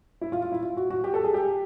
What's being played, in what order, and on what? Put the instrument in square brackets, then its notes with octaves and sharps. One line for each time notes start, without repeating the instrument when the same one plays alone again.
[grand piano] E4
F4
F4
E4
F4
F#4
F#4
G4
A4
G#4
G4